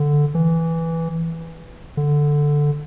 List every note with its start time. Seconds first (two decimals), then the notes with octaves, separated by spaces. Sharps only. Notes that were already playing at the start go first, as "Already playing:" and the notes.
Already playing: D3
0.35 E3
1.97 D3